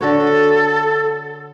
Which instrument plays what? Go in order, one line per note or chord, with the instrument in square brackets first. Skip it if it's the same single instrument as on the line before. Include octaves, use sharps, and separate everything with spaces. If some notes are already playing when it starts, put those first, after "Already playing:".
[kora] D3 F#4 C#5 [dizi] A4